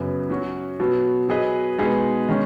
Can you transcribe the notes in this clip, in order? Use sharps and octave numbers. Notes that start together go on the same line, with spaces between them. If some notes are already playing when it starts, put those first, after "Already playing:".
Already playing: F#2 C#3 F#3 B3
F#3 C#4 F#4
B2 F#3 B3
F#3 B3 G#4 B4 D#5
B2 G#3 D#4 G#4 B4
D#3 G#3 C#4